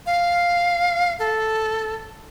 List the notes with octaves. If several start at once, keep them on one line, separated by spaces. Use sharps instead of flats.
F5
A4